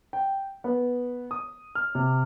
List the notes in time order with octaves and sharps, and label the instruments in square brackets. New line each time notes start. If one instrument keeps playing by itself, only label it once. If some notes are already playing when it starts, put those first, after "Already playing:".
[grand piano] G5
B3
D#6
F6
C3